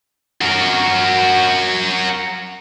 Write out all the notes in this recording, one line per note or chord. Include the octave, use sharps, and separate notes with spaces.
F#4 A#4